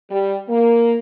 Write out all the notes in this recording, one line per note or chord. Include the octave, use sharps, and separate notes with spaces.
G3
A#3